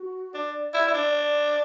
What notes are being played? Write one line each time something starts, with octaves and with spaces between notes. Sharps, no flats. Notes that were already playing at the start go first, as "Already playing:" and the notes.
Already playing: F#4
D4 D5
E4
E4
D4
D5